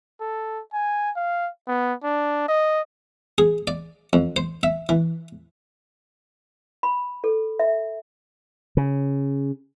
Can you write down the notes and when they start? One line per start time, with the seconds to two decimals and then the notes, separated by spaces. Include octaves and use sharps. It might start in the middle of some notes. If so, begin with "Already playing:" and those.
0.20 A4
0.73 G#5
1.16 F5
1.67 B3
2.04 D4
2.48 D#5
3.38 G#4
3.67 D5
4.13 F2
4.36 C5
4.63 E5
4.89 E3
6.83 B5
7.24 A4
7.59 E5
8.77 C#3